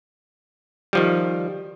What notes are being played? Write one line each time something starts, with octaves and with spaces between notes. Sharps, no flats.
D#3 F3 G3